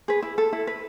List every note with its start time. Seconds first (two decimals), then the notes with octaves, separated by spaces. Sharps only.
0.08 G#4 B4
0.22 E4
0.38 A4
0.53 E4
0.67 B4